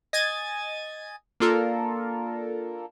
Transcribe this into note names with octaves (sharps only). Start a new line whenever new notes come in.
D#5 G#5 G#6 A6 D#7
A#3 D4 F4 A4 A#4